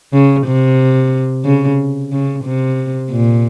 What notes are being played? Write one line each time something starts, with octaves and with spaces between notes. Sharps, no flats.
C#3
C3
C#3
C#3
C3
A#2